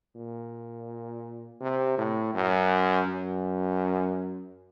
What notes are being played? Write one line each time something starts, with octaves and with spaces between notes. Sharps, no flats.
A#2
C3
A2
F#2
F#2